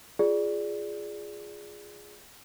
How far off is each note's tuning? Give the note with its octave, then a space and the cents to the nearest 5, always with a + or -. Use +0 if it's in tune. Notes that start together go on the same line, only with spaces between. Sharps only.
F4 +0 G#4 +0 D5 +0